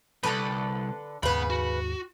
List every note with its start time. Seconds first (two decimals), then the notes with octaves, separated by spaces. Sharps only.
0.23 C2 F#2 D3 A4 B4
1.23 D#2 G#2 C#3 B3 B4 B5
1.50 F#4